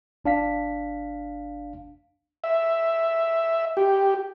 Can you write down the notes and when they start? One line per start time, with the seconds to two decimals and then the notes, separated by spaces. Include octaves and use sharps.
0.24 G1 D4 F5 B6
2.44 E5
3.77 G4